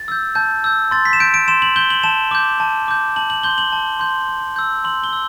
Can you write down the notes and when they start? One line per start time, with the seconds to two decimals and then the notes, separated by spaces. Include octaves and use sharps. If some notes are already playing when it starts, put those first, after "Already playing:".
Already playing: A6
0.08 E6 G6
0.35 A5 G6
0.64 E6 G6
0.91 C6 A6
1.05 B6
1.13 E7
1.20 G6 D7
1.34 D7
1.48 C6 E7
1.62 F#7
1.76 G6 G7
1.90 F#7
2.03 A5 E7
2.31 D6 G6
2.60 A5
2.88 D6 G6
3.16 A5 F#7
3.30 F#7
3.43 C6 G6 G7
3.58 F#7
3.72 A5
4.00 C6 G6
4.28 C6
4.56 E6 G6
4.84 C6 F#7
5.04 G7
5.13 E6